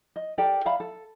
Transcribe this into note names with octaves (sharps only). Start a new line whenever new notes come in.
D#5
G4 A4 A#4 D5
D5 E5 F5 B5
A4